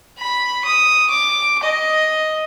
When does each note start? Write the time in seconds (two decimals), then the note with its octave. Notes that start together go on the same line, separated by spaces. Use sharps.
0.19 B5
0.65 D#6
1.10 D6
1.63 D#5